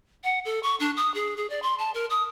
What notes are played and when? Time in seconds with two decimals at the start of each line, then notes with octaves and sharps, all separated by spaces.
0.24 F#5
0.45 A4
0.63 C#6
0.80 D4
0.97 D#6
1.14 G#4
1.37 G#4
1.50 D5
1.62 C6
1.78 A5
1.94 A#4
2.10 D#6